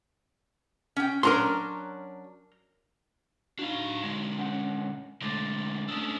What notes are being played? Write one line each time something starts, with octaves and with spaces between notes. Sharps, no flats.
C#4 G5
F#3 C#4 D4 A#4 A#5 C6
D4 D#4 F#4 F5
D3 G#3
C#4 F#5
D3 G#3 A3 D6 A6
A3 C#4 D4 D#6 E6